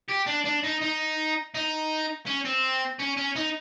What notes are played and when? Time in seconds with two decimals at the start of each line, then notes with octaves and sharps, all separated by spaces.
0.08 G4
0.26 D4
0.45 D4
0.63 D#4
0.81 D#4
1.54 D#4
2.26 C#4
2.45 C4
3.00 C#4
3.17 C#4
3.36 D#4